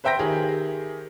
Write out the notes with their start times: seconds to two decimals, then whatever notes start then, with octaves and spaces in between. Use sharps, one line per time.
0.04 B4 C5 E5 G5 G6 A#6
0.19 D#3 G4 G#4